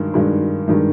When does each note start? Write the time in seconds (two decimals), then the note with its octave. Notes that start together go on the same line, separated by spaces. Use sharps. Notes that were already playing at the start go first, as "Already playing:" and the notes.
Already playing: G2 D#3 G#3
0.14 G2 D#3 G#3
0.68 G2 D#3 G#3